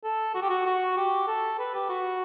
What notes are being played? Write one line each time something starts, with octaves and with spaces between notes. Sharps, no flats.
A4
F#4
G4
F#4
F#4
G4
A4
B4
G4
F#4